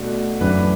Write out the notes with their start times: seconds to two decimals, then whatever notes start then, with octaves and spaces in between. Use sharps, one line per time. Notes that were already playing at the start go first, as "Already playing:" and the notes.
Already playing: B2 A3 D4 F#4
0.41 F#2 A2 E3 D4 B4